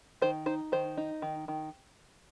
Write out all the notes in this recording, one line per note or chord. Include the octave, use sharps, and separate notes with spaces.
D#3 C5
D#4 C5
D#3 C5
D#4
D#3
D#3